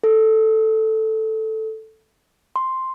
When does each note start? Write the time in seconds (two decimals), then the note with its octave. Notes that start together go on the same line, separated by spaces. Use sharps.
0.04 A4
2.56 C6